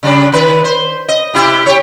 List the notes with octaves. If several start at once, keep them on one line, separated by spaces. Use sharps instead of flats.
C#3 G3 D4
D#3 B4
C5
D#5
C3 E4 G4
G4 C#5